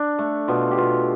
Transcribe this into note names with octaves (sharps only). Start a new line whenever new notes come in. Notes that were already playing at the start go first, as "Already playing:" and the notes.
Already playing: D4
A3
B2 F4
G4
B2 F4